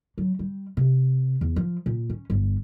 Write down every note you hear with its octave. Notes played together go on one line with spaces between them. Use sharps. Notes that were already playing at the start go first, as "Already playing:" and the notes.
F#3
G3
C3
E2
F3
A#2
C#4
G1